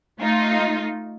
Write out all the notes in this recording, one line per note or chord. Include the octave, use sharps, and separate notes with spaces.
A3 D#4 F4